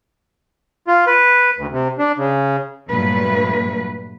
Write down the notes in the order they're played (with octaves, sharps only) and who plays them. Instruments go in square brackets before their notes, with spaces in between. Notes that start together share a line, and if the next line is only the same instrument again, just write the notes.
[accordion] F4
B4
D2
C3
D4
C#3
[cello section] G2 A#2 F#3 A3 B4